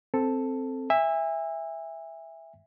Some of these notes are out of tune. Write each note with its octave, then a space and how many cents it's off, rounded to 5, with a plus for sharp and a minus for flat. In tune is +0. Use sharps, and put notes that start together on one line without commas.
C4 +0 A4 +0
E5 +0 G#5 -35